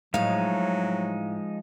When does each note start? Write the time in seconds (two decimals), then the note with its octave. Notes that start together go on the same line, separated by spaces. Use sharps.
0.14 A2 F3 F#3 G#3 D#4 F5